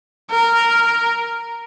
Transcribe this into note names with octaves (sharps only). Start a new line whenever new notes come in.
A#4